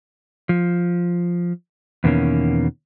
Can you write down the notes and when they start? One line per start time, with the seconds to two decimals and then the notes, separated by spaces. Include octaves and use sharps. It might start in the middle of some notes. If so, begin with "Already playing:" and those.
0.49 F3
2.04 E2 B2 D#3 A#3 C#4